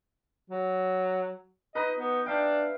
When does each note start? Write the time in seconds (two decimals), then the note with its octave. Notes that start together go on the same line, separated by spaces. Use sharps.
0.50 F#3
1.75 D#4 B4 D#5
1.99 B3
2.26 D4 E5 F5 G5